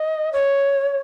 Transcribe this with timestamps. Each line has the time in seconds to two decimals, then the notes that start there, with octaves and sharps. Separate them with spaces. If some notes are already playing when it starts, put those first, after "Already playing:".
Already playing: D#5
0.33 C#5